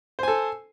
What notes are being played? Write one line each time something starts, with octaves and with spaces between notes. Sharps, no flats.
A4 C5 G#5